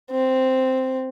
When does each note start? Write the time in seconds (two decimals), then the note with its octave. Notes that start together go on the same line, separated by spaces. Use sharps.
0.11 C4